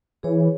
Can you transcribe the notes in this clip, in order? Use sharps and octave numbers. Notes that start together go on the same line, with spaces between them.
E3 G#4 C#5